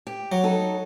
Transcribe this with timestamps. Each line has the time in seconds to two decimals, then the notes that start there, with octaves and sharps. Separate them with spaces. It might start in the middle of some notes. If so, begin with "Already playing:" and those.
0.07 G4
0.32 F#3
0.44 D#4 A4